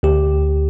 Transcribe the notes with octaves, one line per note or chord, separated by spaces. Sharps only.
D2 G4